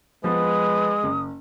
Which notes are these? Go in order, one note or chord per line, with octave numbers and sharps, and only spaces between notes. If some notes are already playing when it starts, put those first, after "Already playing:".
F3 G#3 B3 B4 D#6
F#1